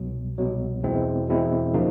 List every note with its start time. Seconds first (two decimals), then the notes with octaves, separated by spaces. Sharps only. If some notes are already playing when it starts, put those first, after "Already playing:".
Already playing: C2 B2 F#3
0.38 C2 B2 F#3
0.83 E2 B2 G#3 C4 E4
1.29 E2 B2 G#3 C4 E4
1.74 C#3 F3 A#3 D#4